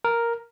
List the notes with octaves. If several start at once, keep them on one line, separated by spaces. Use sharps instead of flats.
A#4